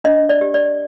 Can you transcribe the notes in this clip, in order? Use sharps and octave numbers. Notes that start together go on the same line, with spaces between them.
D4 D#5
D5
G4
D5